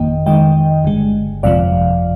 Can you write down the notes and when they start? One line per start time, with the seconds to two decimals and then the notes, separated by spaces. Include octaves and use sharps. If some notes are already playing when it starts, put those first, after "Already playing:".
Already playing: G1 F2 D#3 A#3 D#5 G5
0.26 F2 D#3 G#3 D#5 G5
0.85 G1 G2 D3 G#3
1.43 G1 F2 C3 F3 D5 F5